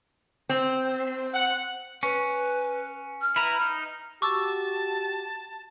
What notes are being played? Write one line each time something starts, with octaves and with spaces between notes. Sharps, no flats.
C4
F#5
C#4 B4
F6
E4 B4 A#5
D#4
F#4 G4 A5 C#6 D6 E6